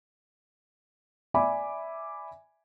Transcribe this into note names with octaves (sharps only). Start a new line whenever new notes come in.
D5 E5 G#5 B5 D6